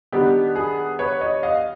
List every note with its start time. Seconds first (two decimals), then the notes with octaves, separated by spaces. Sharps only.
0.12 D#3 G3 B3 D4 G4
0.56 G#4
0.99 B4 C#5
1.21 C#5 D#5
1.43 D#5 F5